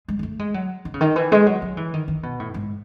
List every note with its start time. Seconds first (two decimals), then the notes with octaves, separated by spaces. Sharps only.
0.08 G#3
0.19 G#3
0.23 A3
0.39 G#3
0.54 F#3
0.85 D#3
0.94 C#3
1.01 D#3
1.16 E3
1.32 G#3
1.46 F#3
1.62 F#3
1.77 E3
1.94 D#3
2.08 D#3
2.23 B2
2.40 A2
2.54 G#2